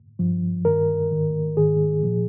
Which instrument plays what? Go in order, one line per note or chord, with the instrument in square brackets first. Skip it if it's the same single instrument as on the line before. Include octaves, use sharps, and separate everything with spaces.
[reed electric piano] G2 F3
G2 D#3 A#4
G#2 D#3
G#2 D#3 G#4
A#2 F3